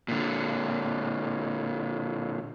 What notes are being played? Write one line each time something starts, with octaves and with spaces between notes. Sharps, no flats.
A#2 D3